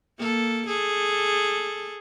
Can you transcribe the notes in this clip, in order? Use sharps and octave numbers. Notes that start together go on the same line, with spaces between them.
A#3 A4
G#4 A4